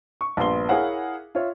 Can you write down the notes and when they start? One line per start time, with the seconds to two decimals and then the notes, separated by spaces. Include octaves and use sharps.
0.21 C#6
0.37 A#1 G2 B3 C6 G7
0.69 E4 G#4 A#4 C#5 F5 F#5
1.35 F4 C#5 E5